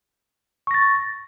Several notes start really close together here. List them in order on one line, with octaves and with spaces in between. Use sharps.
C#6 A#6 A6